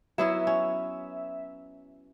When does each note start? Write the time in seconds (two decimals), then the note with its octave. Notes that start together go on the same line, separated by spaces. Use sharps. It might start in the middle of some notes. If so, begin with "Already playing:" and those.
0.18 F#3 B3 E4 E5
0.47 C#4